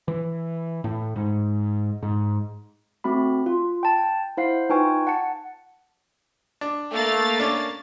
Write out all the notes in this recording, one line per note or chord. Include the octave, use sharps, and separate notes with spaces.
E3
A2
G#2
G#2
A3 C4 F#4 B5
F4
G5 A5
E4 C5 F5 F#5 C7
D#4 F4 B4 G5 G#5 C#6
F#5 A5 C#7
D4
A3 A#3 F5 A6
C#4 D4